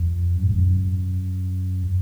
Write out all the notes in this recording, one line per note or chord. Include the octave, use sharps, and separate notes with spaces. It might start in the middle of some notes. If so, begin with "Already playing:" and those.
Already playing: F2
F#2
G#2
F#2